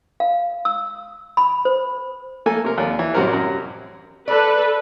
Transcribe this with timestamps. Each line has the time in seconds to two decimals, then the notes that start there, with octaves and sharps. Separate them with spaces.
0.20 F5
0.65 E6
1.37 B5
1.65 C5
2.46 A3 A#3 A4 G#5
2.65 C3 A#4
2.78 D#2 D5
2.99 E3
3.14 A1 C3 G3 F#4 A#4 C5
3.33 F#2
4.28 A4 B4 D5